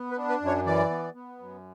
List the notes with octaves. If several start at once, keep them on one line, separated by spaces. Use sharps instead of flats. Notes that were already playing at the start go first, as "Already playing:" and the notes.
Already playing: B3
B4
D4
B4
F#2
C#5
E3 D5
B3
B3
F#2